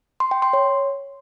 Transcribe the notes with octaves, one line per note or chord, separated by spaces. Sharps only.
C6
G5
C6
C#5